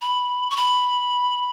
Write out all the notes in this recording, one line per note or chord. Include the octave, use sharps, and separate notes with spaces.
B5
C#6
B5